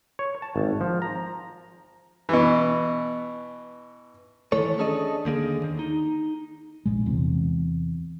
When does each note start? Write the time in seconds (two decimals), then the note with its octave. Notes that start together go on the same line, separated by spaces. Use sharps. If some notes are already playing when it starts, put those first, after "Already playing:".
0.19 C#5
0.42 A5
0.56 G#1
0.81 F3
1.02 A#5
2.29 B2 E3
4.52 D#3 E3 A3 A4 C#5
4.78 C#4 D4 G#4 A4 D5 D#5
5.25 D#2 D3 A#3 G#4
5.64 D#3
5.79 D#4
6.86 A#1 A#2 G#3
7.06 E2 C3